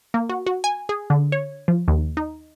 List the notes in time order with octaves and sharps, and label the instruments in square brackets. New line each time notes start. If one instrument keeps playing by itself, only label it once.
[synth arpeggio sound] A#3
F#4
F#4
G#5
G#4
D3
C#5
F3
D#2
D#4